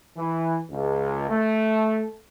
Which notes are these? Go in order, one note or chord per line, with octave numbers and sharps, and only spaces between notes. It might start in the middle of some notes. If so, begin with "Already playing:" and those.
E3
C#2
A3